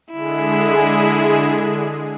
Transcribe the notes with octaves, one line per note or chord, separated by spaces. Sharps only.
D3 G#3 E4 G#4